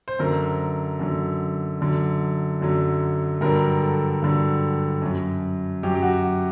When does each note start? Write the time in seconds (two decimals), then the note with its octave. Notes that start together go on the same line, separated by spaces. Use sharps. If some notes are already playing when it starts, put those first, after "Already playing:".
0.08 C5
0.19 F#2 D3 F#3 A#4
1.00 F#2 D3 F#3
1.81 F#2 D3 F#3
2.61 F#2 D3 F#3
3.41 G2 D3 F#3 A#4
3.82 A4
4.22 G2 D3 F#3
5.02 F#2 F#3
5.83 F#2 F#3 G4
5.95 G4
6.03 F#4